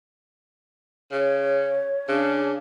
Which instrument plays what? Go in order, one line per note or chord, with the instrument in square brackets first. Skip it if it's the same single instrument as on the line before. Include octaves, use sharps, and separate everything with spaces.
[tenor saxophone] C#3 [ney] C#5
[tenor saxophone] C#3 [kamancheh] D4 G#4